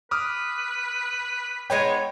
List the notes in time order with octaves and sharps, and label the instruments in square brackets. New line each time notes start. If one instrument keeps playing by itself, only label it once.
[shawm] B4 [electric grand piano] D6 D#6 F6
[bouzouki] G#3 B3 D#4 [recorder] C#5 [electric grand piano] G5